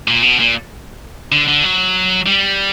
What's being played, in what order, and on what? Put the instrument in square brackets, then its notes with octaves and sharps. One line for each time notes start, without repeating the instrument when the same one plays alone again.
[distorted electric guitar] A#2
B2
A#2
D3
D3
F#3
G3